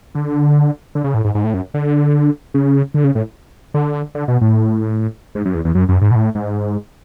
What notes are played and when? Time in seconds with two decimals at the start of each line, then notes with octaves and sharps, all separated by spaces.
0.15 D3
0.95 D3
1.04 C#3
1.14 A2
1.25 G#2
1.35 G#2
1.44 A2
1.54 F#2
1.74 D3
2.54 C#3
2.94 D3
3.04 C#3
3.15 A2
3.74 D3
4.15 D3
4.28 B2
4.41 A2
5.35 G#2
5.45 F#2
5.55 E2
5.65 E2
5.75 F#2
5.89 F#2
6.01 G#2
6.11 B2
6.15 A2
6.35 G#2